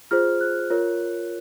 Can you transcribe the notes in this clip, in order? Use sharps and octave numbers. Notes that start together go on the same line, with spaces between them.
F4 G#4 C5 F6
F#6
F4 A#4 C#5